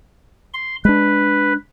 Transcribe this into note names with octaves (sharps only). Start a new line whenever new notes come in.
C6
G#3 D4 B4